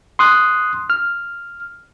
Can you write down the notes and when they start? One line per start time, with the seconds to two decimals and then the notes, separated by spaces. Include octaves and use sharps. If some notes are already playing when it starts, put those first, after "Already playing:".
0.19 C6 D#6 F#6
0.90 F6